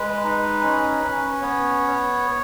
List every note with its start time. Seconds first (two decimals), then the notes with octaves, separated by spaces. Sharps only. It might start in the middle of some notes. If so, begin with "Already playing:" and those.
Already playing: G#3 B4
0.24 D#4
0.63 C#4
1.02 C#4
1.41 B3 C#5